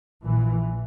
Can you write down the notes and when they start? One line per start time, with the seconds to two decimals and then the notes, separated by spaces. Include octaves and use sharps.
0.23 A#1 A#2 E3